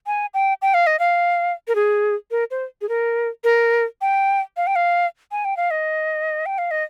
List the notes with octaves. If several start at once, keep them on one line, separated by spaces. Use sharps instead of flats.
G#5
G5
G5
F5
D#5
F5
A#4
G#4
A#4
C5
G#4
A#4
A#4
G5
F5
G5
F5
G#5
G5
F5
D#5
G5
F5
D#5